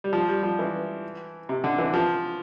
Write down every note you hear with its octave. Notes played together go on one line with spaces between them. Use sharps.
G3
F3
G3
F3
E3
C3
D3
E3
F3